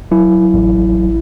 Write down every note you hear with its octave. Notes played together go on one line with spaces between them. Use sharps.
F#3 E4
A1